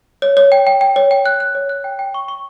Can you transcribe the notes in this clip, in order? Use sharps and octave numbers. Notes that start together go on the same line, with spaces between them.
C#5
C#5
G5
G5
G5
C#5
G5
F#6
F#6
C#5
F#6
G5
G5
C#6
C#6